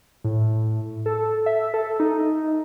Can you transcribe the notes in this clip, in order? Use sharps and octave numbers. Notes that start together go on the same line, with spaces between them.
A2
A4
E5
A4
D#4